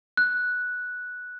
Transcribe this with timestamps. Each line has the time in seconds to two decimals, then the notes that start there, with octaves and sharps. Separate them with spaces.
0.17 F#6